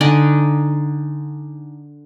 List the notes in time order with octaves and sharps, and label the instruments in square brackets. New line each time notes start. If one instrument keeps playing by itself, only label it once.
[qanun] D3 D#4 D5 G#5